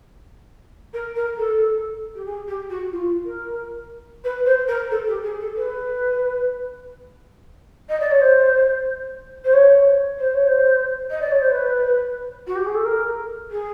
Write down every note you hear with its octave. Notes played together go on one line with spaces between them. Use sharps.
A#4
A#4
A4
G4
G#4
G4
F#4
F4
A#4
B4
C5
A#4
A4
G4
G#4
A4
B4
D#5
D5
C#5
C5
C5
C#5
C5
C#5
C5
D#5
D5
C#5
C5
B4
F#4
G4
G#4
A4
A#4
G#4